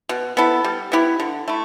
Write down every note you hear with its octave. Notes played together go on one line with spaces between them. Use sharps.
B2
B3 E4 A4
G3
B3 E4 G4
D3
A3 E4